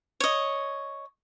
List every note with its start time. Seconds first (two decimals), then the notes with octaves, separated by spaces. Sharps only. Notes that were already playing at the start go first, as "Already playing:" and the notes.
0.20 C#5 D#5